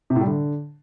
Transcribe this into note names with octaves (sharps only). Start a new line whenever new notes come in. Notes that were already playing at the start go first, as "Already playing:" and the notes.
C3
A2
G3
D3